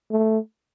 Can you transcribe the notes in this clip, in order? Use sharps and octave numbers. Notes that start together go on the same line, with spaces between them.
A3